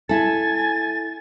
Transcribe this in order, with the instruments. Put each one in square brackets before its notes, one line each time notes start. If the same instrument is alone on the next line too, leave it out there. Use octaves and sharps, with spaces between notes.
[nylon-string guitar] E4 A4 [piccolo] G#5 [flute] A6